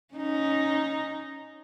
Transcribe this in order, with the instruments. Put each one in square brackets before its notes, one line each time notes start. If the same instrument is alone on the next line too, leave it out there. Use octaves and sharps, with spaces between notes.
[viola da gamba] C#4 D#4